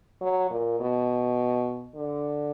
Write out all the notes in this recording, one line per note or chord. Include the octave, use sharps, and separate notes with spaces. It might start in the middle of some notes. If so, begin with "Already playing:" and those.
F#3
A#2
B2
D3